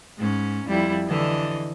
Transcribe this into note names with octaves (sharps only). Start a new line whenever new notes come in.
G#2 C#4
F2 G3 E4
D3 E3 D#5